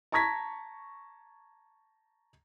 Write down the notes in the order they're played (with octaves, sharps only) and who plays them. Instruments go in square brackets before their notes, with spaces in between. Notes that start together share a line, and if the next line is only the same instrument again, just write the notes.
[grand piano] A5 A#5 C#6 G#6 A#6 B6